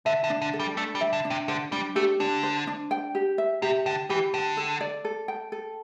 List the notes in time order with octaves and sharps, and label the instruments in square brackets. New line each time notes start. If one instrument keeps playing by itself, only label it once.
[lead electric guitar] D3 [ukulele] E5
[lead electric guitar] D3
[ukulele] D4
[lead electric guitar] D3
[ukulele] A4
[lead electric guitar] G3
[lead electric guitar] A3 [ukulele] D4
[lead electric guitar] G3
[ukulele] E5
[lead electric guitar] D3
[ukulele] D4
[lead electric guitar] C3
[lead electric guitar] D3 [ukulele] C5
[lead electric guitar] G3 [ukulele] D4
[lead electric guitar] A3 [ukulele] G4
[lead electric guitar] D3 [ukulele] D4
[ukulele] C5
D4
G5
G4
E5
[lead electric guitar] C3 [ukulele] G4
[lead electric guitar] D3 [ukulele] G5
[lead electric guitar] E3 [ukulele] G4
[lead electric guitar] D3 [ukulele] G5
[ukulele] A4
D5
A4
G5
A4